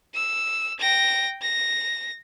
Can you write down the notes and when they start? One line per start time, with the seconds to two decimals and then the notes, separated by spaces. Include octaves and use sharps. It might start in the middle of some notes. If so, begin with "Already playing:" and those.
0.15 E6
0.80 G5 A#6
1.42 A#6